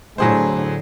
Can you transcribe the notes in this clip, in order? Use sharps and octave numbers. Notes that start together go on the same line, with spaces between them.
A2 D3 F#3 G#4 C5